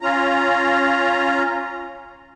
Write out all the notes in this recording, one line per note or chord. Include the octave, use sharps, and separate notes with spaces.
C#4 F4 A#5